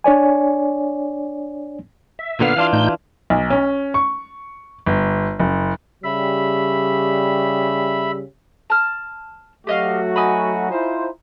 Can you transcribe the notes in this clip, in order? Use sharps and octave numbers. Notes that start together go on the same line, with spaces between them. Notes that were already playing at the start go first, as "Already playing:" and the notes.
D4 C#5 D5 G#5
E5
A#2 D3 B3 F5 F6
E3 D4 F4
A2 D#4 G6
B1
C#4
C#6
G1
F#1
C#3 G3 E5 B5
A5 F6
F#3 A3 F#4 G4 D#5 F5
D#4 G#5 B5
E4 F4 C5